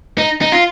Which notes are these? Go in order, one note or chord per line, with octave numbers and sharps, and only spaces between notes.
D#4
D#4
F4